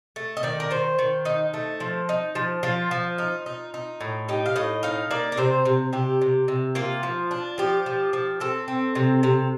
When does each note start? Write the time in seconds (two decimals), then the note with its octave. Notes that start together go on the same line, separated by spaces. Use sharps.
0.16 A3
0.37 D#5
0.43 D#3 D5
0.60 A#4
0.71 D#3 C5
0.99 D#3
1.25 D#4
1.54 A3
1.80 F3
2.09 D#4
2.35 F3
2.63 F3 F4
2.91 F3
3.18 D#4
3.46 D#4
3.74 D#4
4.01 A2
4.29 D#4 G4
4.46 F5
4.56 A2 D#5
4.83 D#4 F5
5.11 A#3 D5
5.32 A#4
5.37 C3 C5
5.65 C3
5.93 C3 G4
6.21 C3
6.48 C3
6.75 A#3 F4
7.03 F3
7.31 D4
7.58 F3 G4
7.86 F3
8.13 F3
8.40 C4 A4
8.68 C4
8.95 C3
9.23 C3